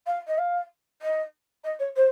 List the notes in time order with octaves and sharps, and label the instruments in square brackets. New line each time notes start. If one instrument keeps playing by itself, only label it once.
[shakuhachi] F5
D#5
F5
D#5
D#5
C#5
C5